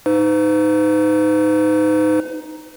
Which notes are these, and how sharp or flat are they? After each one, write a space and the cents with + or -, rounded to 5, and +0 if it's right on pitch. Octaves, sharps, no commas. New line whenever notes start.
D#4 +0 B4 +45